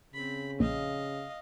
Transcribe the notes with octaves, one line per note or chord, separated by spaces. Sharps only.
C#3 C4 B5
A#1 D#5 F5